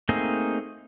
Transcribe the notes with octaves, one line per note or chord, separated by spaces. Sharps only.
A3 A#3 C4 D#4 G#4